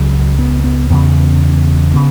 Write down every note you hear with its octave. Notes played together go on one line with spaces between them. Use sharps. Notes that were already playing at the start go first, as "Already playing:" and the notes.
Already playing: C#2 C#3 F#3
B3
B3
E2 C#3 B3
C#3 B3